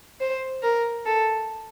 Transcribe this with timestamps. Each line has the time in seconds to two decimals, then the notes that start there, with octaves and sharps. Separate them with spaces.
0.21 C5
0.63 A#4
1.06 A4